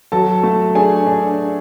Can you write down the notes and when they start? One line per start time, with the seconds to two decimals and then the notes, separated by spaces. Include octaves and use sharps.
0.12 F#3 A4 A5
0.43 A3
0.75 D4 G#4 G#5
1.07 D4